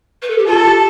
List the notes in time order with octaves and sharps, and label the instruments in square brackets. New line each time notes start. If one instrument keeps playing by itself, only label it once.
[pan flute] B4
A4
G4
[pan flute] F4 [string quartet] A4
[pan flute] G4